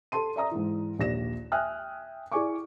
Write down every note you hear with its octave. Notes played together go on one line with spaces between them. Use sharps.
A4 A5 C6 D#7
D5 E5 A#5 D#6
G#2 E3
A#1 D#2 D5 A#6 E7
E5 G5 G#5 D#6 F6 F#6
E4 G#4 D5 G#5 C#6 D6